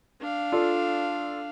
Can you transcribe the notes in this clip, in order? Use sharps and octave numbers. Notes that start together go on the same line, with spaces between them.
D4 F5
F4 A4 D5